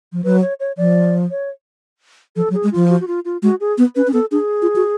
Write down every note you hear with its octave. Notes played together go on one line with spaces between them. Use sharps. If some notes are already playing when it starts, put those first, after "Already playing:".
F3
F#3 B4
C#5
C#5
F3 D5
C#5
F3 A4
F#3
G#4
G#3
F3 F4
F#4
F#4
F4
F4
G#3 F#4
G#4
B3
C#4 B4
C#4
B3 A4
D4 G#4
F4
F#4